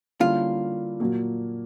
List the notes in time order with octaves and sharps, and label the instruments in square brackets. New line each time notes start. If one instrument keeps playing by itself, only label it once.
[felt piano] D3 G3 A#3 C#4 E4 [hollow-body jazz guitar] F4
[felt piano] A#2 F#3 A#3